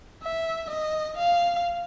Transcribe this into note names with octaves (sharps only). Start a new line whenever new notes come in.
E5
D#5
F5